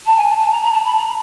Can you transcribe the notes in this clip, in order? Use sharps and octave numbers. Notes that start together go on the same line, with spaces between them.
A5
G#5
A5
A5
A#5
A#5
A5
B5
A#5